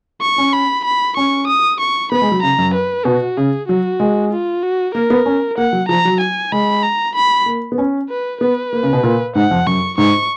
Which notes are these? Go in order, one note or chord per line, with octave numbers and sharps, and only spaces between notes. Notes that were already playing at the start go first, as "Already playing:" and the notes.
C#6
C#4
B5
B5
C#4 C#6
D#6
C#6
B3 B5
G#3
F#3
C#3 A#5
F#2
B4
B2 F#4
C#3 G#4
F#3 F#4
G#3
F4
F#4
A#3 A#4
B3
C#4
A#3 F#5
F#3
F3 A#5
F#3
G#5
G#3 B5
A#5
B5
A#3
B3
C#4
B4
B3 B4
A#3
C#3
B2
A#2
G#2 F#5
F2
F#2 C#6
G#2 C#6